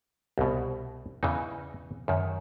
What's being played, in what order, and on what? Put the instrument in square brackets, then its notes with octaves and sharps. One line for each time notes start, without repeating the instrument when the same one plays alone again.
[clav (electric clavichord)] C2 B2
E2 C#3 E3 D#4
F#2 D#3